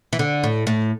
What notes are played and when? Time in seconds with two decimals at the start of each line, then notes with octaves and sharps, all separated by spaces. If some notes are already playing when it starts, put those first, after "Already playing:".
0.13 E3
0.19 D3
0.44 A2
0.67 A2